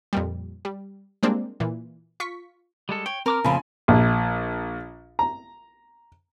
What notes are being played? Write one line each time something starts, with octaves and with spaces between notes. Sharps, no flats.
F2 A#2 G3
G3
G3 G#3 A#3 C4 D4
A#2 E3
F4 C#6 B6
G3 G#3 A4
C#5 G5
C4 A#4 D6 F6
F2 C#3 A3 C4 G#5 B5
A#1
A#5